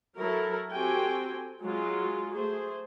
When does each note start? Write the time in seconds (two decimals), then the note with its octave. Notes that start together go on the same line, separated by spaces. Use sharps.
0.18 F#3 E4 A4 A#4
0.71 C4 F#4 G4 A4 G5 G#5
1.62 F#3 G#3 F4
2.34 A3 G#4 C5